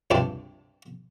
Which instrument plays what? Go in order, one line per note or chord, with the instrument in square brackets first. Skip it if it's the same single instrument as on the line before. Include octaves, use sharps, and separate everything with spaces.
[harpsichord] C#2 G2 C3 D4 G4 D5